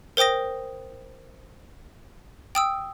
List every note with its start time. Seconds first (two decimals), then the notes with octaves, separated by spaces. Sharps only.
0.17 A#4 C5 G5 D#6 A#6
2.55 G5 D#6 E6